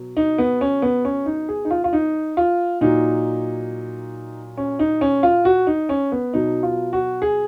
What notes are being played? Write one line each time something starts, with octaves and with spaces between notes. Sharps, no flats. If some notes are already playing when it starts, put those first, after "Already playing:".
Already playing: B2 F#3
D#4
B3
C#4
B3
C#4
D#4
G#4
D#4
F4
F4
D#4
F4
A#2 F#3 D#4
C#4
D#4
C#4
F4
F#4
D#4
C#4
B3
B2 F#3 D#4
F4
F#4
G#4